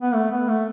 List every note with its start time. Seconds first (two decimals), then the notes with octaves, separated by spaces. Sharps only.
0.02 B3
0.14 A3
0.31 B3
0.48 A3